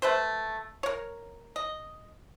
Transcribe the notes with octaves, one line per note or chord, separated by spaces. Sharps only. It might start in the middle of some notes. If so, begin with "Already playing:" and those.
A3 B4 C5
A#4 C#5
D#5